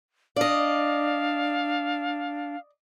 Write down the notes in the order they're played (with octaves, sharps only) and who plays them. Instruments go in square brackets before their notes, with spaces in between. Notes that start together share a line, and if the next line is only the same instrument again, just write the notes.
[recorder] D4 [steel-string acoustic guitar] D5 D#5 [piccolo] F5